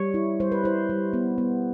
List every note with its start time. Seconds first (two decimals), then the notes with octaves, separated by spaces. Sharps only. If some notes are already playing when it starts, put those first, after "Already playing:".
Already playing: G3 C#5
0.14 E4
0.40 G3 C5
0.52 B4
0.64 E4 C5
0.90 G3
1.13 B3
1.38 B3